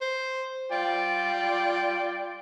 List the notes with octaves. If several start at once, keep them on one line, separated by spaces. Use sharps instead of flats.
C5
F4 D5 G5